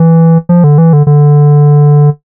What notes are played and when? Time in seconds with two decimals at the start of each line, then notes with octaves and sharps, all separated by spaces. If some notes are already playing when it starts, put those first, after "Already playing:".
Already playing: E3
0.49 F3
0.64 D3
0.78 E3
0.93 D3
1.07 D3